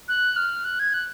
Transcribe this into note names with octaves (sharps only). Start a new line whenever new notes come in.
F#6
F6
F#6
G#6
F#6